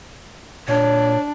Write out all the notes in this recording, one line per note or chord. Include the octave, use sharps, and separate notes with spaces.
A#2 D4 C#5